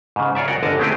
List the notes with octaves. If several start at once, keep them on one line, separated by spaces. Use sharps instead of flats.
G#2 C#3
F4 C#5 D5 E5
F#4 A#4 D5 F#5 G5
G1 D3 A#4 D#5 A5
G#3 A3 C4 E4 G4 G#4